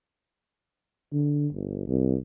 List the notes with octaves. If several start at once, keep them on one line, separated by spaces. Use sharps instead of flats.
D3
G1
C2